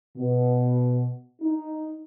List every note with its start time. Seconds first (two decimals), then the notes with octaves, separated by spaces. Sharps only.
0.17 B2
1.42 D#4